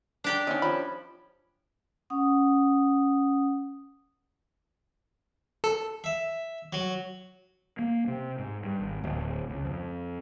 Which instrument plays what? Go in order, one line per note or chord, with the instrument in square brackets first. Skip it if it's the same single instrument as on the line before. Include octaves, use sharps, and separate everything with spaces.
[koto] D4 G4 G5
[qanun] C#4 [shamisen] D#4 D#5
[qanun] F3 [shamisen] B5
[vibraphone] C#4 F#5 D#6
[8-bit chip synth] A4
[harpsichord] E5
F#3
[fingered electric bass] A#3
C3
G#2
G2
G#1
D1
C#2
F2